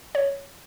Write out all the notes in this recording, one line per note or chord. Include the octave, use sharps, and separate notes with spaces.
C#5